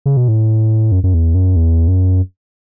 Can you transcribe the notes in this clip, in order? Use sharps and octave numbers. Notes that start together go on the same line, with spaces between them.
C#3
B2
A2
F#2
F#2
E2
F#2
E2
F#2